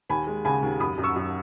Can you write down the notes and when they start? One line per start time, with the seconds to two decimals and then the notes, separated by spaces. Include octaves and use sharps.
0.09 D#2 G#5 B5
0.27 G#3
0.45 C#3 G#5 B5
0.63 D#2
0.80 F#2 B5 D#6
0.98 F#2
1.03 C#6 E6
1.15 F#2